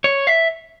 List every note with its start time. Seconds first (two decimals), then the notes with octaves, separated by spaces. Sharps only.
0.04 C#5
0.27 E5